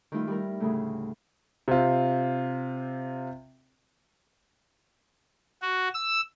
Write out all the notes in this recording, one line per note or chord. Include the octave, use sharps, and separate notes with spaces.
D#3 G3 A3 E4 F4
G3 E4 A#4
D2 A2 C#3 A3
C3 C4 F4
F#4
E6